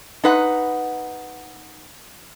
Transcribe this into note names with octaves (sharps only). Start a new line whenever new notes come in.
D#4 B4 F#5